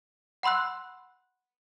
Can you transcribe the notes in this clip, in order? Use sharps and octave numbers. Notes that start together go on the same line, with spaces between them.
F#5 B5 C6 E6 F#6